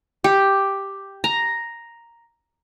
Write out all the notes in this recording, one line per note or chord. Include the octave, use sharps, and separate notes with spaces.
G4
A#5